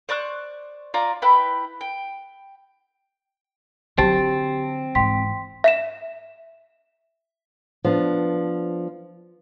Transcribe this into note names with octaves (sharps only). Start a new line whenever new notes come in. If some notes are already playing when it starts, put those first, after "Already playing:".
C5 D5 C#6 F#6
F4 D5 G#5 A#5
E4 B4 G5
G5
D3 F#3 C4 G4 A5 A6
G#2 E3 G5 C6 B6
E5 B6 E7
F3 B3 D4